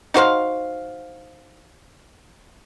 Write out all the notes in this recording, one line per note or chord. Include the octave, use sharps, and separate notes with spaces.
D#4 F#4 C5 F5